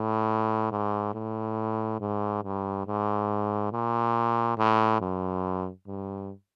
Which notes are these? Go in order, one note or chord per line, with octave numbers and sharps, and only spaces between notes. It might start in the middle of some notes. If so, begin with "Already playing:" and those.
Already playing: A2
G#2
A2
G#2
G2
G#2
A#2
A2
F#2
G2